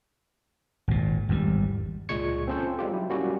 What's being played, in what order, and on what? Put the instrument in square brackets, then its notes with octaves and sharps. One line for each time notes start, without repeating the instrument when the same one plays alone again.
[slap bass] G#1 A#2
G#1 E2 B2 G3
[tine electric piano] C#2 A#2 G#3 C#6 G#6 C#7
C4 C#4 F4 A4 C5
G3 G#3 F4 G4
F#3 E4
G3 A#3 C#4 F#4 G4